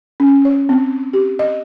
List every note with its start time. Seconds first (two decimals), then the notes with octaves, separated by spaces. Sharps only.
0.20 C#4
0.45 C#5
0.69 C4
1.13 G4
1.39 D#5